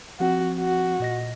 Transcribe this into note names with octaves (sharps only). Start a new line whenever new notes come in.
F3 C4 F#4 F#5
F#4
A#2 D#5 A#6